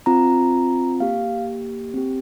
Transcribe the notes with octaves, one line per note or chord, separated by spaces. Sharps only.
C4 F4 A#5
A#3 G4 F5
C4 G4